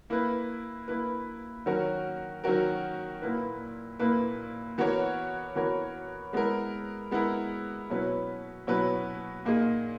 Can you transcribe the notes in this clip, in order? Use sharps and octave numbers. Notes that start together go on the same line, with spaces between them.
A#3 E4 B4
A#3 E4 B4
D#3 F#3 C#4 F#4 A#4
D#3 F#3 C#4 F#4 A#4
A#2 A#3 E4 B4
A#2 A#3 E4 B4
E3 B3 F#4 A#4 C#5
E3 B3 F#4 A#4 C#5
G#3 B3 E4 A#4
G#3 B3 E4 A#4
B2 F#3 C#4 E4 B4
B2 F#3 C#4 E4 B4
A#2 A#3 D#4 G#4